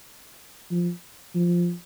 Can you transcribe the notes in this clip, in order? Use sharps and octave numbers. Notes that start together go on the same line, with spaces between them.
F3
F3